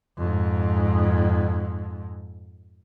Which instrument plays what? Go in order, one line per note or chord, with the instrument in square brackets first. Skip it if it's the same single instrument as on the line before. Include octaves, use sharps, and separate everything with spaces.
[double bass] F2 G#2